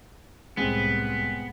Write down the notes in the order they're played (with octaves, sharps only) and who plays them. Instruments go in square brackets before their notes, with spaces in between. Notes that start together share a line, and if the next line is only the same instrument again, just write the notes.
[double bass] C2 A2 [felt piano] G#3 C4 [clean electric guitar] B3